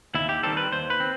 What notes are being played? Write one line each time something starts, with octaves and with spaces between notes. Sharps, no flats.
D#2 E4
G4
D#3 G3 C4 A4
B4
D#2 C5
B4
C4